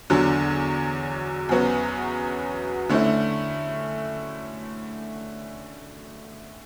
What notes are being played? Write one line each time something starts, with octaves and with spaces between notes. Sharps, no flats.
E2 D3 F#3
E2 C#3 F#3 B3 F#4
D3 A3 C#4 E4